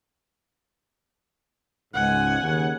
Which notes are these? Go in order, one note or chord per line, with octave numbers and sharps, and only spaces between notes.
C#2 G#2 F#5 G#5
D#2 C#3